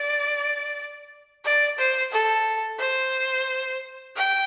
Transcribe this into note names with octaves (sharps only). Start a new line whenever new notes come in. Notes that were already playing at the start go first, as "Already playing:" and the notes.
Already playing: D5
D5
C5
A4
C5
G5